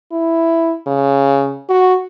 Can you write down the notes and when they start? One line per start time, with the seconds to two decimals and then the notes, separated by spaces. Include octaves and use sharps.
0.12 E4
0.87 C#3
1.70 F#4